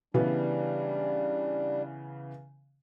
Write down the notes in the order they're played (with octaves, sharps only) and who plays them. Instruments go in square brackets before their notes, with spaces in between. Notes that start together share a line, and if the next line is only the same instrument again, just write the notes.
[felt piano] C#3 E3 B3 [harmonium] G3 D4